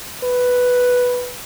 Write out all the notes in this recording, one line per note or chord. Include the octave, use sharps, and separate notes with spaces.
B4